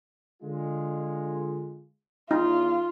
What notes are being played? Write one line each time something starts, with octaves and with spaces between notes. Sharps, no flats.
D3 G#3 F4
E2 D#4 F4